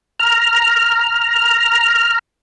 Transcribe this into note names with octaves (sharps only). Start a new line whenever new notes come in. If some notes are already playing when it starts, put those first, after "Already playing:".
A#5 F6